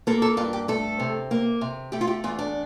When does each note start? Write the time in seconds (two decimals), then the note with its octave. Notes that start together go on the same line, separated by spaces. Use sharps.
0.07 A#3 A4
0.22 A4
0.37 G2 F4
0.53 G4
0.68 A3 A4
0.99 C3
1.31 A#3
1.61 C3
1.92 A3 G4
2.01 F4
2.07 G4
2.24 E2 F4
2.39 D4